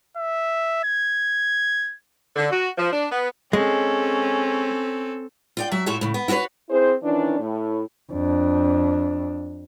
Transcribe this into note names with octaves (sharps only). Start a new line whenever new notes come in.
E5
G#6
D3
F#4
F3
D4
B3
G#3 C4 C#4 A4
F4 D5 G5
F#3 E5 A5
A2 F4 F#4 A4 C#5 E5
A2 C#3
B3
E4 F#4 A4 B4 C#5
C4 E4 G#4 C5
D#3 E3 C#4 D4
A2
F2 D4